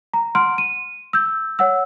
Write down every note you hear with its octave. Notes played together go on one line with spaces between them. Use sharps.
A#5
F#5 C6 F6 D7
D#7
E6 G6
C#5 F#5 E6